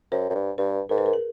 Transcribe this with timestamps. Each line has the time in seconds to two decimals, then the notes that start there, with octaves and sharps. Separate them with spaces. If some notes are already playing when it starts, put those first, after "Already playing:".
0.12 F#2 C5
0.30 F#2
0.35 G2
0.58 G2 B4
0.89 G#2 A#4
0.98 B4
1.06 A#4
1.13 G#4